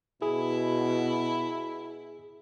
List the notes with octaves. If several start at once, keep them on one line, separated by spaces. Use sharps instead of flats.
B2 E4 G#4